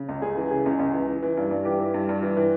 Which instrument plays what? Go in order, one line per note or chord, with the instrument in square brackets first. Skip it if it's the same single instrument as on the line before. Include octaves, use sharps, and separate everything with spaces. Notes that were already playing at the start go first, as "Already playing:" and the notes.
Already playing: [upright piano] C#3
C#2
C#2 G#4
E3
C#3 G#4
C#2
C#2
E3
E3
E3
G2
G2
E3 G4
E3
G2
G2
E3
E3